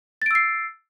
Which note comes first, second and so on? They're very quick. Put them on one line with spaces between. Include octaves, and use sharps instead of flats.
A6 D7 E6 C7